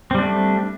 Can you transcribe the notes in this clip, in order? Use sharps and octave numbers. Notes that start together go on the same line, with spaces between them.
G3 A3 C4 D4